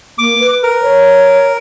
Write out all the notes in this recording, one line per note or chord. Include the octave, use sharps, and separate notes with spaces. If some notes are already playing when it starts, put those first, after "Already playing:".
A#3 D6
B4
A#4
C#5